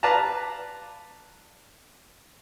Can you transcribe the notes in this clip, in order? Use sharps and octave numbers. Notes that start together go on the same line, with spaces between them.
B4 D5 F5 A5 A#5